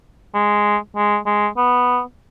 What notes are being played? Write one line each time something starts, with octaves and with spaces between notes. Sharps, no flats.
G#3
G#3
G#3
B3